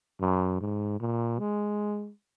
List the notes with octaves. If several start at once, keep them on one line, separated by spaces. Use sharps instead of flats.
F#2
G#2
A#2
G#3